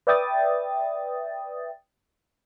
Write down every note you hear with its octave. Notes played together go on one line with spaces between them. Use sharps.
B4 D5 E5 G5 D#6 A6